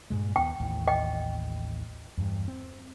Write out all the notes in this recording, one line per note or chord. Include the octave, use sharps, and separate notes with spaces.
G2 A#2 G#3
D#2 B3 G5
A1 D#2 A2
D#5 G5
E2 G2
C4